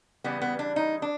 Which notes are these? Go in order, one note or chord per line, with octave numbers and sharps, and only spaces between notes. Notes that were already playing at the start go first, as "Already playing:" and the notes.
C#3 E3 G3 B3
B3
D4
D#4
D4